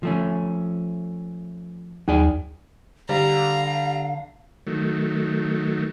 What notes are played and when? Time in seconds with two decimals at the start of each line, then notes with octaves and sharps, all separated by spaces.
0.03 F3 A3 C#4
2.08 D#2 F#3 G#4 D5
3.09 D3 G3 F5 A#5
4.67 D#3 F#3 A3